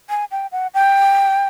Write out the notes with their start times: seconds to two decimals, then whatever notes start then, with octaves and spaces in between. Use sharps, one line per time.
0.10 G#5
0.31 G5
0.52 F#5
0.74 G5